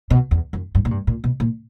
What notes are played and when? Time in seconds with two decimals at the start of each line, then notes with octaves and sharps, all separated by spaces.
0.10 B2
0.31 E2
0.53 F#2
0.75 G2
0.85 A#2
0.91 G2
1.07 A#2
1.24 B2
1.40 A#2